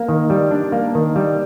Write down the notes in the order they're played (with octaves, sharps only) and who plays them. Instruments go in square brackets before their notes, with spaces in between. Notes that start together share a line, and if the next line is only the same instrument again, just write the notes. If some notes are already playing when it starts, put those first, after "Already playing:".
Already playing: [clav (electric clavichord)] A#3
D#3
G3
D4
A#3
D#3
G3